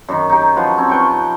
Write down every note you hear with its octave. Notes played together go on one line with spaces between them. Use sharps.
F#2 D#3
D#4 G4
F3 F#3 F4 B4
C4 C#4
B4 G5 C#6